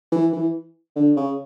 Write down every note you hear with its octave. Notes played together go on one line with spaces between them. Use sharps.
E3
E3
D3
C#3